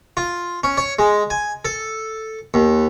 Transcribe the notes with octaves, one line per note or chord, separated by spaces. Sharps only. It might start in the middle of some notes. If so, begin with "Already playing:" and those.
F4
C#4
C#5
G#3
G#5
A4
D#2